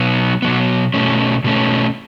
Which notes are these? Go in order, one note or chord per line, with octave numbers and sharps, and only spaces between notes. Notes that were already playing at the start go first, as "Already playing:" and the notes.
Already playing: B2 F#3 B3
B2 F#3 B3
B2 A3 C#4
B2 A3 C#4